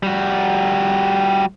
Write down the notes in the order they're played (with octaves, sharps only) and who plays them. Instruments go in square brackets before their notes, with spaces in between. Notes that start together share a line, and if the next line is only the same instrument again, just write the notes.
[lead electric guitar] G3 F#4